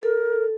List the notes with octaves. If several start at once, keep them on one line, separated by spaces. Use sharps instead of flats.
A4 A#4